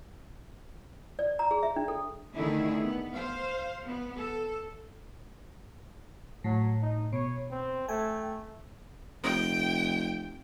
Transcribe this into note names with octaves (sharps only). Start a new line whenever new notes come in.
D5
A#5
G#4
E5
D4
A4
D3 D#3 A3 E4 G#4
B3
C5 F5
B3
A4
A2 F#3
D#4
B2 C#5
C4
A3 G5 G#5
F1 G5